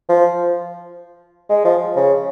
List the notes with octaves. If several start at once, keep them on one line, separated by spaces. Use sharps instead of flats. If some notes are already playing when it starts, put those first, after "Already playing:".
F3
G#3
F3
C#3